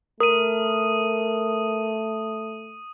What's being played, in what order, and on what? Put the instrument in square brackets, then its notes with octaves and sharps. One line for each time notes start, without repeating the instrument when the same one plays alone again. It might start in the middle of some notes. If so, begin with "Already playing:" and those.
[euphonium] A3 [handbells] A#4 [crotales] D#6 D#7